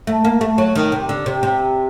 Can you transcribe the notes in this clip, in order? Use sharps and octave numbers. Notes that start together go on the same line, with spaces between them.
A3
A#3
A3
F#3
D#3
C3
D3
C3
C3